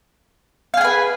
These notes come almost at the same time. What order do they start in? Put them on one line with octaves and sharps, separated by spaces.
F5 G#4 G#5 B4